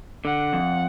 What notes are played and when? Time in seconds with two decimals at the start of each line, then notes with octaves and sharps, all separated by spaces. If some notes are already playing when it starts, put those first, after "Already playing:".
0.25 D3 F#5
0.53 F2